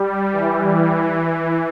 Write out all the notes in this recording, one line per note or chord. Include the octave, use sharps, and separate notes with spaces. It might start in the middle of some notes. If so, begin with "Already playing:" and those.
Already playing: G3
E3
E3